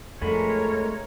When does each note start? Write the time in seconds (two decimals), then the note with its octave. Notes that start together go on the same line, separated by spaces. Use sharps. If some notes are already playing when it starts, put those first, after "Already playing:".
0.22 F2 D3 G#3 A3 A#4 C#5 B5